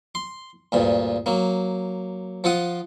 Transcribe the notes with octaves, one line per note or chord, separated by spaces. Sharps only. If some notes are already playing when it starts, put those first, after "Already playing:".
C6
D2 G2 A#2
F#3 A#3
F3 F4 F#5 D#6